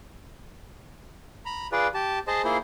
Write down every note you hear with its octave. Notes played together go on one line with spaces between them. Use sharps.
A#5 B5
F4 G#4 B4 D5
G4 A5
G#4 C5 D#5 A5
A#3 E4 F4 G#4 C5